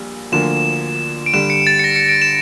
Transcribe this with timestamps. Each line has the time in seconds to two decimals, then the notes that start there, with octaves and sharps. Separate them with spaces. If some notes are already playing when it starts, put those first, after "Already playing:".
Already playing: A#1 A#2 G3
0.32 D2 D3 F3 A#3 E7
1.26 D7
1.33 G2 D3 G3 E7
1.50 C#7
1.67 A6
1.79 C#7
1.84 A#6
1.96 C#7
2.09 D7
2.22 E7